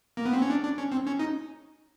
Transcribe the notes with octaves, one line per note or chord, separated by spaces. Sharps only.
A#3
B3
C4
C#4
D4
D4
C#4
C4
C#4
D#4